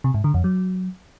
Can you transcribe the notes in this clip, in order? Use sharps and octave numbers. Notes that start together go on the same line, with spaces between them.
C3
G#2
D3
F2
F#3